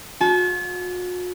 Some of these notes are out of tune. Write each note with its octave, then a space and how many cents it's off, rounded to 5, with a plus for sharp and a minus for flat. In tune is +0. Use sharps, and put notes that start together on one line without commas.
F#4 -45 A5 -40